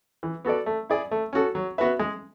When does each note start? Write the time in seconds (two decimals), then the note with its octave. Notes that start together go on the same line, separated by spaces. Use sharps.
0.23 E3
0.45 B3 F#4 A4 D5
0.66 A3
0.90 E4 G#4 D5
1.11 A3
1.33 C#4 F#4 A4
1.55 F#3
1.78 B3 F#4 B4 E5
1.99 G#3